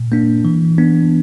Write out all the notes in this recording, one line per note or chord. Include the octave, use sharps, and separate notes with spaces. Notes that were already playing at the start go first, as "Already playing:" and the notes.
Already playing: A#2
A#3 D4
E3
B3 D4